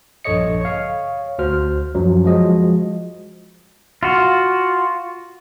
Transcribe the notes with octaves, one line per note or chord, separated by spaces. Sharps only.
A#1 G2 A4 C#5 D#5 C#7
C#5 F5
D2 F#4 C5 F6
F#2 F3 F#3
F3 G#3 F#4 D#5
F4 F#4